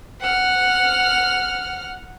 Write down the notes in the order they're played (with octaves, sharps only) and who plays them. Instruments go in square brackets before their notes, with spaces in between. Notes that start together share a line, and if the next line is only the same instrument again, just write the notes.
[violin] F#5 F6